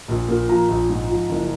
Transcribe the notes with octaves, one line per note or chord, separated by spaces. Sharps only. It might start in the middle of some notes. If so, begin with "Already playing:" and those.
A#1
A#2
F3 A#5
A#1
G#2
F3
F#1